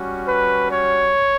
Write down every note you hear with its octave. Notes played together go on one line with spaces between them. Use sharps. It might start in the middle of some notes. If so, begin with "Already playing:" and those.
Already playing: G3 C#4 F#4
B4
C#5